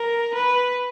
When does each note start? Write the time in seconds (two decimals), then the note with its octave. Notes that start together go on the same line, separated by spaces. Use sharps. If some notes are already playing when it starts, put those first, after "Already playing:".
Already playing: A#4
0.34 B4